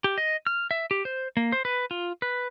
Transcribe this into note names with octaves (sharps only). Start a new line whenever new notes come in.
G4
D#5
F6
E5
G4
C5
A#3
C5
B4
F4
B4